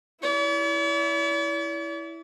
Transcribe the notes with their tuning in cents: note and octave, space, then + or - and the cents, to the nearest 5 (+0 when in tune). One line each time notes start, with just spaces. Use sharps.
E4 +0 D5 -45